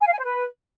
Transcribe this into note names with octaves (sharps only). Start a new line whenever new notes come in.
G#5
F5
G#5
C5
B4